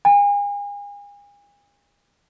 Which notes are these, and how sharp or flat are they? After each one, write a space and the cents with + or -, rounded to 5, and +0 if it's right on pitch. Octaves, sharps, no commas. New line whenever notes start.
G#5 -40